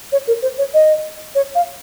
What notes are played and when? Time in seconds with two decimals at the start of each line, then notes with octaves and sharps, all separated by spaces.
0.12 C#5
0.27 A#4
0.42 C5
0.58 C#5
0.74 D#5
1.35 C#5
1.55 F5